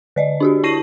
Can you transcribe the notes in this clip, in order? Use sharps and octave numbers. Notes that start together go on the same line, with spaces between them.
D3 D5 D#5
D4 F#4 G4
E4 A5 C#6 A#6 C7 D#7